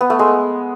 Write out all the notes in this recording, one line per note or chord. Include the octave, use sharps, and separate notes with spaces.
B3
A3
G#3